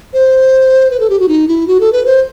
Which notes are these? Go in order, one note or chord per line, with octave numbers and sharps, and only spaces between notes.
C5
B4
A4
G4
F#4
D#4
E4
F#4
A4
B4
C5